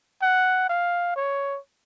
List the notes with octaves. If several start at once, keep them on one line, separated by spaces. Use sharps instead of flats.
F#5
F5
C#5